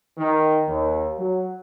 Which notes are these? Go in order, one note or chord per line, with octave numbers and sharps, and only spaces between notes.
D#3
D#2
F#3